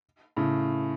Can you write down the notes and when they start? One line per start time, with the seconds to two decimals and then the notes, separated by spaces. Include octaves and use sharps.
0.37 A2 C#3